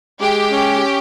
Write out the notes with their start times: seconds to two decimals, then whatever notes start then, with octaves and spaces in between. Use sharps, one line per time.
0.20 G#3 G4
0.51 C#4